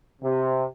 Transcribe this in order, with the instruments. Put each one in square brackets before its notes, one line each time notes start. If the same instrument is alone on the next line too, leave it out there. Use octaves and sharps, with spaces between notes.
[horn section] C3